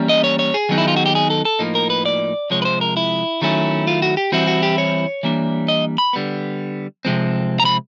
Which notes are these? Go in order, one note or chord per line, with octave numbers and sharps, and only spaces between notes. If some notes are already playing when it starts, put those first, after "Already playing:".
Already playing: E3 G3 A#3 C#4
D#5
C#5
C#5
G#4
D#3 F#3 B3 D#4
E4
F4
F#4
G4
G#4
A4
A4
A2 F3 A#3 D#4
A#4
B4
D5
C3 F3 G#3 C#5
B4
C5
A#4
E4
D#3 F#3 A3 C#4 E4
F4
F#4
G4
E3 G3 C4 E4 F#4
F#4
G4
C#5
E3 G3 A#3 D4
D#5
B5
D3 G3 B3
C3 F3 G#3 C4
A#5
B5